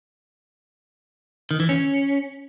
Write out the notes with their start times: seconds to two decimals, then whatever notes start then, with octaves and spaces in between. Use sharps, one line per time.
1.51 D#3
1.60 E3
1.69 C#4